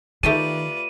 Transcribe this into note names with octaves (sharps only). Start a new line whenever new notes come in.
D#3 A3 F4 G4 B4 D5 A5 D#7